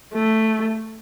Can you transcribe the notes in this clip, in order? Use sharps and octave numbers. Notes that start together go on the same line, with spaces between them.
A3